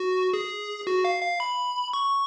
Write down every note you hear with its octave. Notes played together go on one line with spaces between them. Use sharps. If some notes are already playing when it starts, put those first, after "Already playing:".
Already playing: F#4
G#4
F#4
F5
F5
B5
C#6